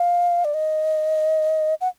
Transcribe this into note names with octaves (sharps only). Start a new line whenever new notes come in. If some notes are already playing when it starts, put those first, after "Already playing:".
Already playing: F5
D5
D#5
F#5